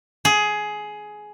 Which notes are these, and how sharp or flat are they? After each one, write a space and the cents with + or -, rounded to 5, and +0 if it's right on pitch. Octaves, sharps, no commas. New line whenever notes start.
G#4 +15